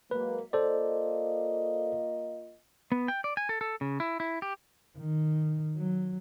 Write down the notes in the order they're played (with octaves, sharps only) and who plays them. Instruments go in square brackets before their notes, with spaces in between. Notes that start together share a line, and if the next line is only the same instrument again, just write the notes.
[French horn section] F#3 G#3 A#3 [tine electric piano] B4
[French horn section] A#3 F4 D#5 [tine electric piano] A4 C5 D5
[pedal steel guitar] B3
G5
D5
G#5
A4
A4
C#3
E4
E4
G4
[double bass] D#3
F#3